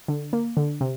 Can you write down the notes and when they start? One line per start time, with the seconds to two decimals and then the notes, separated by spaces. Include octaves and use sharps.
0.08 D3
0.33 A#3
0.57 D3
0.81 C3